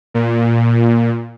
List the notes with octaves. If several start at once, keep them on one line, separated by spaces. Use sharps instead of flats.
A#2